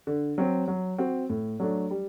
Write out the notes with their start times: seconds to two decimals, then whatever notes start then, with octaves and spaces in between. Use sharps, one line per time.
0.07 D3
0.38 F#3 C4
0.68 F#3
0.98 C4 F#4
1.30 A2
1.60 F#3 A3 D4
1.90 G3